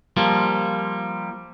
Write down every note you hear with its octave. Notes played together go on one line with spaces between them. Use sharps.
F3 G3 A#3 F4